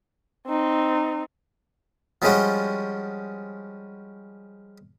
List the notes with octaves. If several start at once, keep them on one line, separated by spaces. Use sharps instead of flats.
C4 D#4
F3 G3 G#3 C#4 F4 F#4